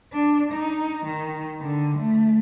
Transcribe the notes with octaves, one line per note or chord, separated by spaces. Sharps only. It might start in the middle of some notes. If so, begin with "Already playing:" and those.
D4
D#4
D#3
D3
A3